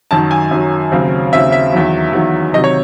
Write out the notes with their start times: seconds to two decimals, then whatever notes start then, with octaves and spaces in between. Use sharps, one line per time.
0.11 F#2 D#3 F#3 A5
0.31 G#5
0.51 F#2 D#3 F#3
0.92 D#2 C#3 F#3 C4
1.32 D#2 C#3 F#3 C4 E5
1.52 E5
1.72 E2 D#3 F#3
2.13 E2 D#3 F#3
2.54 C3 D#3 F#3 D#5
2.64 C#5